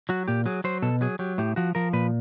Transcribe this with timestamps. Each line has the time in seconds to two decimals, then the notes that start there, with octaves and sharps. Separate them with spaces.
0.09 F#3 F#4
0.28 A#2 G4
0.46 F#3 G#4
0.64 F#3 C5
0.82 B2 A4
1.01 F#3 G#4
1.19 F#3 G4
1.38 A2 G4
1.56 F3 F#4
1.75 F3 A#4
1.93 A#2 B4